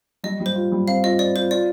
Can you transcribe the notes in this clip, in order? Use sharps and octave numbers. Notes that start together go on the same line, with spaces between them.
G3 D#5
G3
C5
F4
G3
C4 F5
F4 D#5
C4 D5
F4 C5
F4 D5